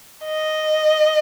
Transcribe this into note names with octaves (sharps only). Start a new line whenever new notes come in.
D#5